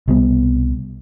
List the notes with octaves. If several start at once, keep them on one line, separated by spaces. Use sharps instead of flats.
C2 B2 G3 B3